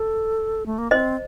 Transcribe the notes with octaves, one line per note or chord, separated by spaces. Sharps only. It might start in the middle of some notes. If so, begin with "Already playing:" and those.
Already playing: A4
A3
A#3
C4 C5 D#5